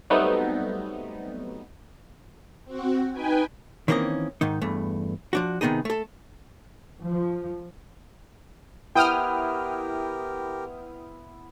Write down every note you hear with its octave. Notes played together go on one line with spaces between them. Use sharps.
F#3 G3 A3 B3 C4 D#4
C4 F#4
D#4 B4 G5 G#5
D#3 E3 A#3 C4 C#4 D#5
G#2 D#3 D#4
E2 G2 A3
F3 D4 F#4
C3 D#3 B3 D#4 G#4
A3 A4
F3
B3 E4 G4 A#4 C5 G5 D#6 F6